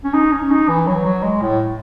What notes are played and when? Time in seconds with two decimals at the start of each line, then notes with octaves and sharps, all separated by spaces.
0.04 C#4
0.13 D#4
0.32 C#4
0.50 D#4
0.68 E3
0.87 F#3
1.05 F#3
1.23 G#3
1.42 A2